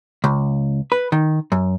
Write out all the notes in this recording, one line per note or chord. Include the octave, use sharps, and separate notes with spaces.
C#2
B4
D#3
F#2